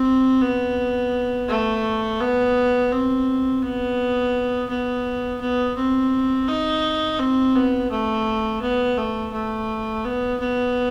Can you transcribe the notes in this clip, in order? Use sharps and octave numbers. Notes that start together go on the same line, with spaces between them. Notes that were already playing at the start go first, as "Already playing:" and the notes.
Already playing: C4
B3
A3
B3
C4
B3
B3
B3
C4
D#4
C4
B3
A3
B3
A3
A3
B3
B3